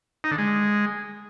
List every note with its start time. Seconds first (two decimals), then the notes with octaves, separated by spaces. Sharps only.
0.24 D#4
0.31 D3
0.38 G#3